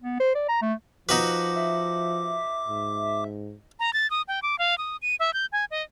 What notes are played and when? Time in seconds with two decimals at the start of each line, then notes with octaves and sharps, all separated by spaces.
0.02 B3
0.20 C5
0.35 D5
0.49 A#5
0.62 A3
1.09 F3 D#4 F#4 B4 D6
1.56 E5
2.68 G#2
3.80 A#5
3.93 A6
4.11 D#6
4.28 G5
4.43 D6
4.59 F5
4.78 D#6
5.02 D#7
5.20 E5
5.34 G6
5.52 G#5
5.71 D#5